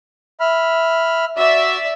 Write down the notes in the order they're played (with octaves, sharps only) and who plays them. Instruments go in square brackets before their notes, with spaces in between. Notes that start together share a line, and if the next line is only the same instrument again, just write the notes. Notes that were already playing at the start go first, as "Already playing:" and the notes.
[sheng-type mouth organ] E5 B5 F6
[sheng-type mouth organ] F#4 [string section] D5 E5